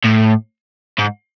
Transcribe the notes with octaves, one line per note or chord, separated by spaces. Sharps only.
A2
G#2